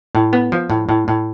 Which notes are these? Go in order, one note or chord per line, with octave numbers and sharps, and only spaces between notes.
A2
B3
F3
A2
A2
A2